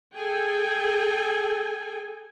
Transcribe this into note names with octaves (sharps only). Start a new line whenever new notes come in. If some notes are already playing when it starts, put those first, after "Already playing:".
G#4 A4 G5 G#5